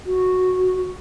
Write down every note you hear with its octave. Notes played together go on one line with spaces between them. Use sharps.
F#4